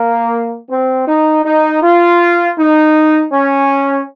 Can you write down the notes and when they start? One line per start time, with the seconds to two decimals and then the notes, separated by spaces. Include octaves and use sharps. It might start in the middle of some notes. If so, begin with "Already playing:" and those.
Already playing: A#3
0.69 C4
1.06 D#4
1.44 D#4
1.82 F4
2.58 D#4
3.32 C#4